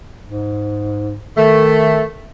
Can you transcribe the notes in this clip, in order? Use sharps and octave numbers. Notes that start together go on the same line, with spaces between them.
G#2
D#3 A3